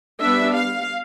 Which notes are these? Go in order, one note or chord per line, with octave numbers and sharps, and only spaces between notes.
G3 B3 D4 E5
F5